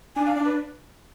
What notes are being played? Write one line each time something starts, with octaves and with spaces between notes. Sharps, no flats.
D4 G#5
F5
D4 D5
B4